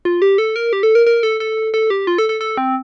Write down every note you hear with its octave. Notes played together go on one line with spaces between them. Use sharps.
F4
G4
A4
A#4
G4
A4
A#4
A#4
A4
A4
A4
G4
F4
A4
A4
A4
C4